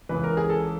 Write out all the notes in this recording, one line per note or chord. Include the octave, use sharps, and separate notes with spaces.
C#2 C#3 E3 B4
A#4
G#4
A4